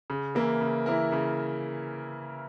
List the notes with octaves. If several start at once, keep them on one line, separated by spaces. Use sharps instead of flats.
C#3
E3 A#3 E4 A#4
C#3
E3 A#3 E4 A#4
C#3